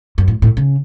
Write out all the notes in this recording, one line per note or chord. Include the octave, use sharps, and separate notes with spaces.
F#2
A2
A2
C#3